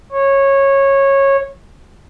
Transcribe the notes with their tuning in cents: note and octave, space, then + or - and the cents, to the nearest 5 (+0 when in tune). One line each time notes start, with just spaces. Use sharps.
C#5 -15